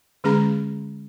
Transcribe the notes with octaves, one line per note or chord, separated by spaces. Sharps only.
D3 G#3 C#4 G#4 A#5 B5